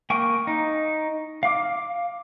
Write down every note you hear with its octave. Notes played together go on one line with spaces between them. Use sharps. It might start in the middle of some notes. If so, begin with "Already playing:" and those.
A#3 G5 G#5 C#6
D#4
F5 D6